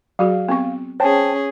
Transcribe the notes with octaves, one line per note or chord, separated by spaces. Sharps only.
F#3 F#4 G#4 F5
B3 C4 C#6
C#4 G#4 C5 C#5 G5 A5